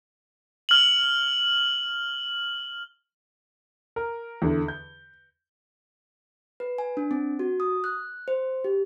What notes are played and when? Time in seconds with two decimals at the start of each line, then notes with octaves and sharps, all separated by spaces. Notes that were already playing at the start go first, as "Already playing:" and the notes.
0.69 F6 F#7
3.96 A#4
4.42 E2 D3
4.68 G6
6.60 B4
6.78 G#5
6.97 D4
7.11 C4
7.39 F#4
7.60 D#6
7.84 F#6
8.28 C5
8.64 G4